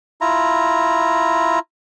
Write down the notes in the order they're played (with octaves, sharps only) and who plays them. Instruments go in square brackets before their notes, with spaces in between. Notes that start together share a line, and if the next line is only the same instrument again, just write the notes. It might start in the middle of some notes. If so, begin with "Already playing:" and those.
[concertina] E4 F4 A#5